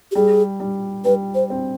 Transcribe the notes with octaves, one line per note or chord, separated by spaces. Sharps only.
G4
G3 G#4
G3
G3 B4
C5
C4